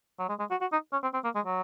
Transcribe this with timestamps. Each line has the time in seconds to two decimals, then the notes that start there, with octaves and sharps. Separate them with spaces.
0.19 F#3
0.29 G#3
0.39 G#3
0.51 F#4
0.61 F#4
0.72 D#4
0.92 C#4
1.03 C4
1.14 C4
1.24 A#3
1.35 G#3
1.46 F#3